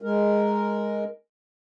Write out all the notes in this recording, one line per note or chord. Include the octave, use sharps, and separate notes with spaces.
G#3 A#4